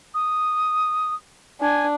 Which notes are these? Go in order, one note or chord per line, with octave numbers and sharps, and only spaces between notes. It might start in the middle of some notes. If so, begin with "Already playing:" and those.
D#6
D4 G#5